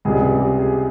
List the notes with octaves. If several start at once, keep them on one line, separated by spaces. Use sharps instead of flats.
C#2 C3 G3 G#4
G4
G#4